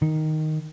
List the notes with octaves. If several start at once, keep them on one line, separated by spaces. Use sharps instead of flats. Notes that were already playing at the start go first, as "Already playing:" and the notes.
D#3